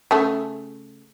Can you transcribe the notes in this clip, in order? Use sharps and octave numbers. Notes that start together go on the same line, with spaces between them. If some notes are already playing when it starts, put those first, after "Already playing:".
C#3 A3